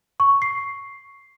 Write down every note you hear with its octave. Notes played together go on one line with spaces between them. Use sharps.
C#6
C7